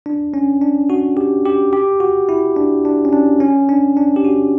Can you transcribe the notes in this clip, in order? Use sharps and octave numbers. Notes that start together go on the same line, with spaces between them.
D4
C#4
D4
F#4
G4
G4
G4
F#4
E4
D4
D4
C#4
D4
C#4
D4
D4
G4
F#4